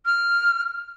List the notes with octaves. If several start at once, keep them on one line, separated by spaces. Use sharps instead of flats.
F6